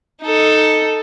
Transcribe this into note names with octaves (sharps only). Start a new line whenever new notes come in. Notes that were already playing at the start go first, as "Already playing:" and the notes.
D#4 A4